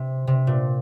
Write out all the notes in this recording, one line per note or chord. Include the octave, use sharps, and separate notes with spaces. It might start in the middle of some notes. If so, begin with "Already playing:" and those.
Already playing: C3
C3
A#2